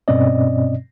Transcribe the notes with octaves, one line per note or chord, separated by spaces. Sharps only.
G2 B2 C4 C#4 D5 D#5